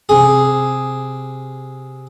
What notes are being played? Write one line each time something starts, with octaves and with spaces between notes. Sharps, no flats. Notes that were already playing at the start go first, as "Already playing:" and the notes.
C3 G#4